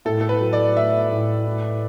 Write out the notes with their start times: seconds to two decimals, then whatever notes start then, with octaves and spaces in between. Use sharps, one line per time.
0.05 A2 A4
0.21 A4
0.29 B4
0.41 F#3
0.53 D5
0.76 A3 E5
1.11 A2
1.47 A2